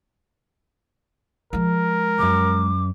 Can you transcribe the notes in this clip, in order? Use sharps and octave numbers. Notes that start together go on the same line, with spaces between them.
F3 G#3 A#4
C#2 F#2 D6